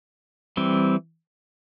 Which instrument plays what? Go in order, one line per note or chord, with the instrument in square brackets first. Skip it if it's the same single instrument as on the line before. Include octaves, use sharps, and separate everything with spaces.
[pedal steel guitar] E3 G3 C4